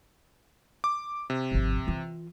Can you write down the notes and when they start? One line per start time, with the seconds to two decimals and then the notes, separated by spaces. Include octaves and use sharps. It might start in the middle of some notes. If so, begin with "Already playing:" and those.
0.84 D6
1.30 C3
1.52 G#1 F2
1.87 E3 F4